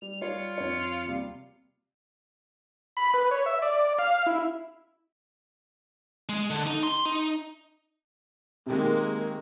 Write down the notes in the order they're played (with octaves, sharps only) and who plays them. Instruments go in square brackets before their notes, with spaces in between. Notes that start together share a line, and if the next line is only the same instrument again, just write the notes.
[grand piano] G3 [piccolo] F7
[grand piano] G3 C#5 [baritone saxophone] F4 [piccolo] C#7
[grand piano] F2 C#5
D#2 C3 G3
[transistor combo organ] B5
B4
C#5
E5
D5
F5
E4
[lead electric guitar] G#3
D3
D#4
C6
D#4
[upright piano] C3 D#3 [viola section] G#3 A#3